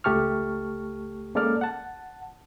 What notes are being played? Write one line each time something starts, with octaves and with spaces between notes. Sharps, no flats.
C#2 A3 G4 A5 C#6 F6
G#3 A#3 C#4 A4 D5 F6
F#5 A5